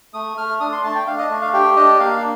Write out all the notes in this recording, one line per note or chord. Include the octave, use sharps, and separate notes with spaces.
A3 D#6
A3 F6
D4 D#6
C6
A3 A5
G5
D4 F5
D#5
A3
F5
G4 G5
D4 D#5
A#3 F5